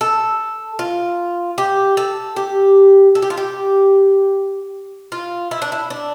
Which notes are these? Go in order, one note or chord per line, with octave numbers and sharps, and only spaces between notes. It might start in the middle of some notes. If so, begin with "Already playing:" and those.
A4
F4
G4
A4
G4
A4
G4
F4
G4
F4
E4
D4
E4
D4